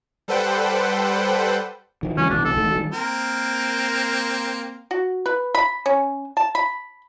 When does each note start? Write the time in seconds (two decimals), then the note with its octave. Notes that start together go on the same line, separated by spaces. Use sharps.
0.28 G3 A4 B4 C5 F#5 G5
2.03 D#3 F3
2.17 F#1 E3 G#3 C#4
2.30 C2 B2 E3 D4
2.45 A4
2.57 E1 D#3 A3
2.73 D#3 F3 G3
2.92 A#3 C4 A#4
4.91 F#4
5.26 B4
5.55 B5
5.86 C#4
6.37 A5
6.55 B5